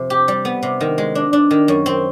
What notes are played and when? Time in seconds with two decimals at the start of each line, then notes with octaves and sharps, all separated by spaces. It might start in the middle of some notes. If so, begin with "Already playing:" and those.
Already playing: F2 C3
0.10 G4
0.28 G3
0.45 B3
0.63 C3
0.81 D#3
0.98 G#3
1.15 D4
1.33 D4
1.51 D#3
1.68 F#2
1.86 C4